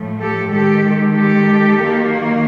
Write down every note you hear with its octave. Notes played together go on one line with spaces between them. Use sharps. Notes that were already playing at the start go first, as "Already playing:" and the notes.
Already playing: A2 F3 A3
G4 A4
D#3 G#3 G4 A4
G4 A4
D#3 F#3 A#3